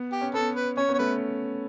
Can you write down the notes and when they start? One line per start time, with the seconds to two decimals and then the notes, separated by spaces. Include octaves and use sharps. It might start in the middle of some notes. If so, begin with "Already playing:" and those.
Already playing: B3
0.12 G4
0.21 C#4
0.34 B3 A4
0.55 B4
0.77 C#4 C#5
0.89 B3
0.94 C#5
0.99 A3 B4